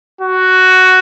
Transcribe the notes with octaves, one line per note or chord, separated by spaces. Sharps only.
F#4